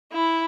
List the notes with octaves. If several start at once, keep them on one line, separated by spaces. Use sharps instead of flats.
E4